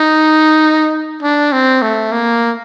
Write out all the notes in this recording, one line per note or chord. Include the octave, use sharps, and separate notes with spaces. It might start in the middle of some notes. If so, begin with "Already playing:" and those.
Already playing: D#4
D4
C4
A3
A#3